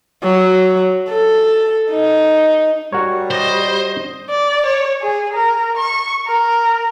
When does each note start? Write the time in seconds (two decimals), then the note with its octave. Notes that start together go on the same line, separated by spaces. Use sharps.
0.23 F#3
1.09 A4
1.91 D#4
2.93 G3 F#4 A#4 C#5
3.31 C5 D#5
4.30 D5
4.66 C#5
5.02 G#4
5.34 A#4
5.77 C#6
6.28 A#4